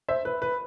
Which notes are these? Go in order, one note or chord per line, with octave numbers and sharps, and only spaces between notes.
C5 E5
B4
B4